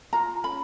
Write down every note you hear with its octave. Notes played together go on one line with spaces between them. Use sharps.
F4 A#5
C#4 B5